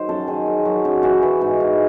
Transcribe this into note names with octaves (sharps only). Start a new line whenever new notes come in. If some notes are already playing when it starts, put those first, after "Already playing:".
Already playing: D#3 F#3 C5
F#2 A4
D#3 G#4
F#2
F#3
F#2
E3 F#4
E3
G#2
G#2